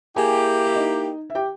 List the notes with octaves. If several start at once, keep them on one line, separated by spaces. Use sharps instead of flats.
A#3 E4 G4 G#4 G#5
E5
D#4 D#5
E5
G4 G5